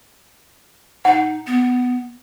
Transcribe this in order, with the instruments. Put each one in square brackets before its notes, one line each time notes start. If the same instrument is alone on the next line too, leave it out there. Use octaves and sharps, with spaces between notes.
[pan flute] D#4 [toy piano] F#5
[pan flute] B3